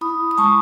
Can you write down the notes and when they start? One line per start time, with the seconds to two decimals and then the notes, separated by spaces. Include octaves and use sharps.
0.01 E4 B5 D#6
0.31 D#6
0.38 G#3 A5 C#6